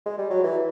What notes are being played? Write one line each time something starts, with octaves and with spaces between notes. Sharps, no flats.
G#3
G3
F#3
E3